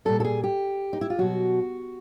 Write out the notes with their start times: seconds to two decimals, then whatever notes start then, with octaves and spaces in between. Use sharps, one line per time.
0.05 A#2 G3 A4
0.20 A4
0.25 G#4
0.44 G4
0.93 D#4
1.01 E4
1.10 F4
1.18 B2 F#3 F#4